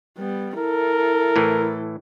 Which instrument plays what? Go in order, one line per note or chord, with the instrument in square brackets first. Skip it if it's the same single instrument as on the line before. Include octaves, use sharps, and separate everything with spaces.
[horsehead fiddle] G3 B3
[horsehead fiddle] E4 A4 [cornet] A#4
[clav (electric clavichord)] A2 E3